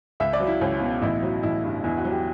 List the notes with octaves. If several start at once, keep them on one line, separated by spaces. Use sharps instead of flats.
C#2 E5
D5
F#3
E4
C#2 C#4
B2
A1 E4
F#3
A1 E4
G2
E2 E4
F#4
F#3
G4